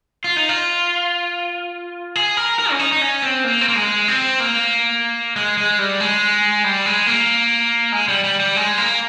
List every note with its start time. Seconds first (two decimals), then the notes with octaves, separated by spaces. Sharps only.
0.24 F4
0.37 D#4
0.49 F4
2.16 G#4
2.37 A#4
2.59 A#4
2.70 C#4
2.79 D#4
2.92 D#4
3.01 C#4
3.22 C4
3.44 A#3
3.61 C4
3.68 A#3
3.76 G#3
4.08 C4
4.40 A#3
5.36 G#3
5.58 G#3
5.79 G3
6.00 G#3
6.64 G3
6.86 G#3
7.07 A#3
7.92 G#3
8.08 G3
8.24 G3
8.40 G3
8.56 G#3
8.78 A#3